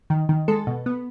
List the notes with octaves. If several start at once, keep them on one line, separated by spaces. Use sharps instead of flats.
D#3
D#3
G#3 A4
B2
B3